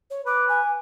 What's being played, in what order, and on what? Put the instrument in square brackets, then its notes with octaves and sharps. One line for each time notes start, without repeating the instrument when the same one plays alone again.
[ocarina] C#5
[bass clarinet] B4 [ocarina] D6
[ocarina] G#5